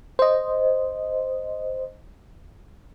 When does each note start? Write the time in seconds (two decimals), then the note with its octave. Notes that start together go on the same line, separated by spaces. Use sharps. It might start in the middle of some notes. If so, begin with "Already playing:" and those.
0.19 C5 D#5